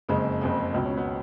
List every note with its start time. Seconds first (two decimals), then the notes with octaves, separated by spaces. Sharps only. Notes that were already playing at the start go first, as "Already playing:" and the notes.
0.09 F#1 F2 C#3 G#3
0.41 F#1 F2 C#3
0.74 C#2 B2
0.85 C#4
0.97 B3